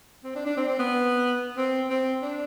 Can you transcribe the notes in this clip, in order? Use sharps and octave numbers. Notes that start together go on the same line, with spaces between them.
C4
D4
D4
C4
C4
B3
C4
C4
D4